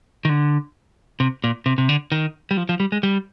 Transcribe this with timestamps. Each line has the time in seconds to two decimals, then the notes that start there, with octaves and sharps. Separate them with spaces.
0.25 D#3
0.29 D3
1.20 C3
1.44 A#2
1.66 C3
1.78 C3
1.89 D3
2.12 D#3
2.51 G3
2.57 F3
2.69 F3
2.80 G3
2.92 G#3
3.03 G3